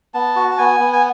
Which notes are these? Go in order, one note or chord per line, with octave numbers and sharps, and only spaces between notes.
B3 A5
F#4
A5
B3 G#5
B3
G#5